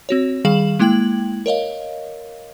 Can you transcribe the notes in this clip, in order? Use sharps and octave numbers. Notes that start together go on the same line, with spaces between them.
C4 F#4 C#5
D#3 G3 G#4 F5 E7 F#7
G#3 A#3 E4 G5 G#6 F#7
A#4 C#5 D#5 F5